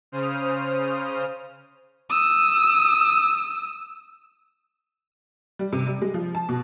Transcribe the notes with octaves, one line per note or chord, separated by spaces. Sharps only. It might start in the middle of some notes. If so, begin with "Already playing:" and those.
C#3 C5 D#6 F6
D#6 E6
G3
C3
G3
G#3
F3
A5
B2